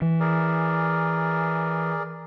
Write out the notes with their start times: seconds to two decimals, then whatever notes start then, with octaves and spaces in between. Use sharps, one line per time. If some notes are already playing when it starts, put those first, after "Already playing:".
0.02 E3
0.20 G#4 A#4 D5